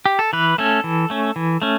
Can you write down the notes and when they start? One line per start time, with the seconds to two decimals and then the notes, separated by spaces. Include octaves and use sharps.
0.06 G4
0.19 A4
0.33 E3 B4
0.58 A3 C#4 A4
0.84 E3
1.10 A3 C#4
1.36 E3
1.62 A3 C#4